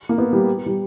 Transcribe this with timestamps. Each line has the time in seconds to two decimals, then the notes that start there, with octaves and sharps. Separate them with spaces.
0.09 A#3
0.18 B3
0.33 G3
0.66 G3